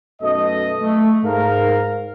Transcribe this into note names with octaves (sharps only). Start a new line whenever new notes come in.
B1 F#2 B2 A3 D#5
A3
G#2 A#4 F5